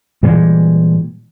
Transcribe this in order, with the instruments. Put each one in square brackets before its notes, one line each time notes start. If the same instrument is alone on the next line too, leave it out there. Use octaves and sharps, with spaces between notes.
[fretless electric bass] A#2 E3 G3 G#3